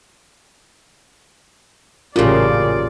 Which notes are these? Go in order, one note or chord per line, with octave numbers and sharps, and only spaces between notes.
A1 F#2 A#2 C#3 F4 G4 G#4 D5